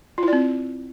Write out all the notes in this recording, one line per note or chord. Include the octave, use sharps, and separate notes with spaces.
C4 E4 F4 D5